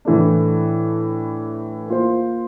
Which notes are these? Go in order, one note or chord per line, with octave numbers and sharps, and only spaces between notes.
A2 E3 A3 D4
A#3 F4 C5